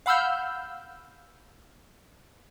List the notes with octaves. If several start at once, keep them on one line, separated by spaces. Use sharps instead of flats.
F5 F#5 B5 E6 F6 G6